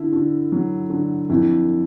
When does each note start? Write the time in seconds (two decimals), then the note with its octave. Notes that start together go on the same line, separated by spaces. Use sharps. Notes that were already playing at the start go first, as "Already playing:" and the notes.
Already playing: D3 E4
0.13 D3
0.52 F#3
0.90 D3
1.29 F2 E4